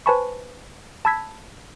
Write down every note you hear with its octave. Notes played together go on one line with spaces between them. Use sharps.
B4 C5 G#5 A5 B5 C#6
A5 B5 E6 G#6 B6